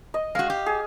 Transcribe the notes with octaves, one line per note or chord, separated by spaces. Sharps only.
D#5
G#3 F#4 F5
G4
G#4